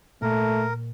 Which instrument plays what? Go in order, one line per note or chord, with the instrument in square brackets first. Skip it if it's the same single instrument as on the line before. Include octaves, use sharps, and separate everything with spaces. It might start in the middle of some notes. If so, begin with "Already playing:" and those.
[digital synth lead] A#2 [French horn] A3 [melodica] A#4